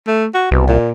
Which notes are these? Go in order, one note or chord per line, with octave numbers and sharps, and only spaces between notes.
A3
F#4
C2 B2
A#2